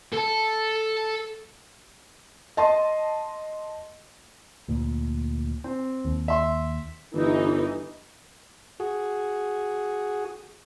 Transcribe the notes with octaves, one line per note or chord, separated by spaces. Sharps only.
A4 A5
D#5 A5 C6
D2 A#2
C4
D#2
E5 C6
G1 E3 D#4
F#4 G#4